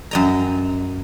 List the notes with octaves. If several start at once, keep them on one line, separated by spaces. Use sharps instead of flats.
F#2 D#5 A#5